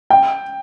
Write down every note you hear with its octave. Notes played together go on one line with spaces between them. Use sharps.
G5